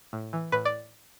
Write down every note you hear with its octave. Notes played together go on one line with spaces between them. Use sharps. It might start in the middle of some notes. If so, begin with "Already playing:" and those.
A2
E3
A2 B4
D5